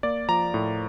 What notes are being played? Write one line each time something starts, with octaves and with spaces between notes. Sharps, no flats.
A#3 D5
F3 A#5
A2